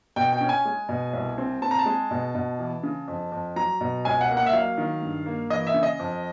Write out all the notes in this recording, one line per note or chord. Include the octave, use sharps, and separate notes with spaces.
B2 G5
G5
C#4
G#5
G#3
B2
C2
C4
C4 A5
A#5
A5
G#3
B2
B2
E3
C#3
F2
F2
F#3 A#5
B2
C#2 G#5
F#5
A#3
F#5
E5
F#3 F5
D#3
G2
A#3
E3 D#5
E5
C#3
D#5
F2